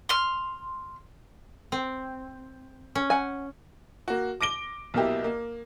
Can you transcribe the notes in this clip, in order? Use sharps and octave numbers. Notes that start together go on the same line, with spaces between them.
C6 F6
C4
C#4
F#5 G#5
A#3 F#4
D6 A#6 D7 G7
B1 B2 A#3 E4 G4
A#3